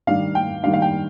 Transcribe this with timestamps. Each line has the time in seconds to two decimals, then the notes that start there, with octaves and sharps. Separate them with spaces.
0.07 D#3 G3 D4 F5
0.35 G5
0.63 D#3 G3 D4 F5
0.73 F5
0.82 G5